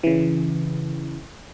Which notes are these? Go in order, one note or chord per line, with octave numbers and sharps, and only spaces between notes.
C#3 E3